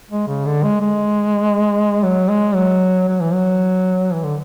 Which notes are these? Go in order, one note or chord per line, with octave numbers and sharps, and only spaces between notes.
G#3
C#3
D3
G#3
G#3
F#3
G#3
F#3
F#3
E3
F#3
E3
D3